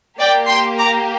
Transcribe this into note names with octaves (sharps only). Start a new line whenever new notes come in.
A#3 G4 D5 G5
G5 C6
A#5 D6